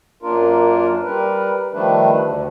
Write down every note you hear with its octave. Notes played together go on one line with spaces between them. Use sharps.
F#2 A#3 D4 F4 A#4
G3 A#4 B4
D#3 F3 G3 A3 D4 B4
D2 D3